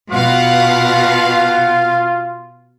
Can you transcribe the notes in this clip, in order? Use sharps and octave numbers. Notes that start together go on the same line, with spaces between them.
B2 F4 F5 F#5